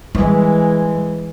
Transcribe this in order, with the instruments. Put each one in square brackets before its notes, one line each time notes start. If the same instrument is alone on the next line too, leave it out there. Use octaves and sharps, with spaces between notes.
[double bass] E3 G#3 [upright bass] G3